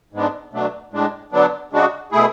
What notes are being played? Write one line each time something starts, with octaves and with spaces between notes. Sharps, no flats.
G#2 G#3 B3 D4
B2 F#3 A3 D4
A2 G#3 D4
D3 F#3 B3 D4
C#3 G#3 D4 F#4
B2 A3 E4 G#4